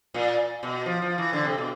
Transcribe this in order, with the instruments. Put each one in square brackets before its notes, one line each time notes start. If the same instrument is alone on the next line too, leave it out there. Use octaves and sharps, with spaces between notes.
[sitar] A#2
B2
F3
F3
E3
D3
C3
B2